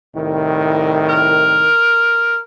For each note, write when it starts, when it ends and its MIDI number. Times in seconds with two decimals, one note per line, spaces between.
0.15 1.69 36
0.15 1.69 45
0.15 1.69 51
1.09 2.38 70